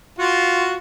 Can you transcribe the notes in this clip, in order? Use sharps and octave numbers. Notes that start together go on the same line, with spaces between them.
F4 F#4